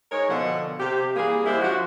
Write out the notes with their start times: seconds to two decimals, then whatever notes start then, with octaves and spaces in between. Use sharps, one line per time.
0.11 G#3 D#4 A#4 C#5
0.29 B2 D3 F3 D#5 F#5
0.80 C3 G4
1.17 E3 G3 A#3 G#4
1.46 G#3 D4 E4 G4 C5
1.62 F3 F#4